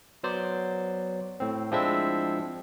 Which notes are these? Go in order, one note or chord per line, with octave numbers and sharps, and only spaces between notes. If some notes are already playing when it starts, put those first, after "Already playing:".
F#3 B3 C5 D5
A2 C4
F3 G#3 C4 D4 E4 E5